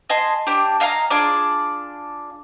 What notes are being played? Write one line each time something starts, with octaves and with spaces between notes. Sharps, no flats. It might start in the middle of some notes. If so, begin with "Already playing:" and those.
D#5 G#5 A5 C6
D4 G4
D#5 F5 G#5 A#5
D4 F4 G#4 D5